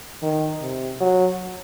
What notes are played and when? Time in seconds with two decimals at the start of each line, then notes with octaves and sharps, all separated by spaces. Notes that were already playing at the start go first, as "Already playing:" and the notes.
0.23 D#3
0.61 C3
1.00 F#3